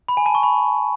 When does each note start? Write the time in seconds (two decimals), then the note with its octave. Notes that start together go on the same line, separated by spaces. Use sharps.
0.08 B5
0.17 G#5
0.26 A5
0.35 C#6
0.43 B5